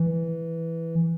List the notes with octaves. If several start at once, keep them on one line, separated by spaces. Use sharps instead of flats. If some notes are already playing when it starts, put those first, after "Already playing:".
Already playing: E3